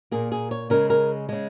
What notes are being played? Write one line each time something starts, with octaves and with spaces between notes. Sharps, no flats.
A#2 A#3 G#4
G#4
C#5
C#3 G#3 A#4
A#4
C#3 G#3